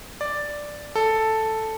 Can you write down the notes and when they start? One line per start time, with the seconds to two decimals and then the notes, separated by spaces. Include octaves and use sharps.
0.21 D5
0.96 A4